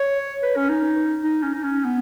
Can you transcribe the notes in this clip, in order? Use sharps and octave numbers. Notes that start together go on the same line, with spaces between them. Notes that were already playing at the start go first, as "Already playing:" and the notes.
Already playing: C#5
B4
C#4
D#4
D#4
C#4
D#4
C#4
B3